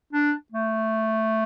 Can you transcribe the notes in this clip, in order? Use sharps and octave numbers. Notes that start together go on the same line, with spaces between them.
D4
A3